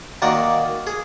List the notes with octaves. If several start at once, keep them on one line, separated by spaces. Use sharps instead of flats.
D#3 A#3 F#4 D5
G#4